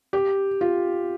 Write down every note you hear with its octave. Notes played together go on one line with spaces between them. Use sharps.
G4
F4